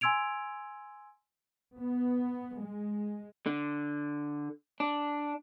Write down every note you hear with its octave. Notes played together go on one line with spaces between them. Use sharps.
G#5 C6 E6 G#6 D7 F7
B3
G#3
D3
D4